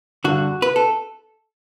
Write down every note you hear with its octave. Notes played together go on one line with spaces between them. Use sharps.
G2 D3 F#4
B4
A4